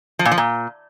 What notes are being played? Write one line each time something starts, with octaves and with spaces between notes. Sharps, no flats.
F3
A#2
F3
A#2